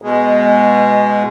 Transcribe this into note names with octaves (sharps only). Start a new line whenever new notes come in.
B2 G#3